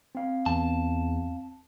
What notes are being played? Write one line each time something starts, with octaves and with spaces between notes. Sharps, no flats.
C4 F5
E2 A5